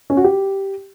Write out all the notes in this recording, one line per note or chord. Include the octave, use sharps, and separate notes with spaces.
C#4
F#4
G4